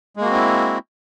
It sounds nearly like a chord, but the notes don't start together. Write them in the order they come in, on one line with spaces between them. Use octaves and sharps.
G#3 A#3 F#4 C4 E4